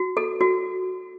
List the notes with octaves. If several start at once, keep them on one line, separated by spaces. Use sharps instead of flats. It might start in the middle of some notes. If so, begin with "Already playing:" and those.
Already playing: F#4
A4
F#4